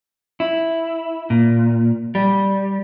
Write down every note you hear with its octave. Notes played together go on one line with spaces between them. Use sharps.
E4
A#2
G3